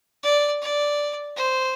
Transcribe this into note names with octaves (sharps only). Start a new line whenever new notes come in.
D5
D5
C5